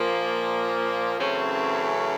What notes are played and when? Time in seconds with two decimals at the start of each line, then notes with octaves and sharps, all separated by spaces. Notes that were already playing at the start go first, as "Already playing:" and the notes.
Already playing: A#2 F3 A#3
1.18 F#2 C#3 E3 A3 C4 C#4